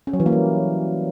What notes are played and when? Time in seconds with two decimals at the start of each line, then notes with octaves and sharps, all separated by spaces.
0.07 C#4
0.13 F#3
0.20 E3
0.26 A#3
0.32 G3